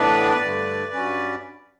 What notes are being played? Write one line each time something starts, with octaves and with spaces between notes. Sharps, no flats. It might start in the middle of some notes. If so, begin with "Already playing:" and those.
Already playing: A2 E3 B3 D4 B4 D5
G2 D3 A3
G2 F#3 C#4